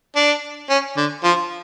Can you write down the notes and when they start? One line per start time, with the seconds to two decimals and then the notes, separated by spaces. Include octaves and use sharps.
0.16 D4
0.69 C#4
0.97 D3
1.24 F3